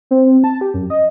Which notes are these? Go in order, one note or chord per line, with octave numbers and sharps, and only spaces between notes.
C4
A5
G4
F#2
D#5